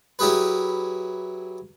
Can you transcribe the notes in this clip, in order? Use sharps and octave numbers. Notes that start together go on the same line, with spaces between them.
F#3 E4 G4 G#4 B4